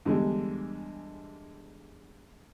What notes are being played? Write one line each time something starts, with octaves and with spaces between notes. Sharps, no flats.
E2 D3 G3 G#3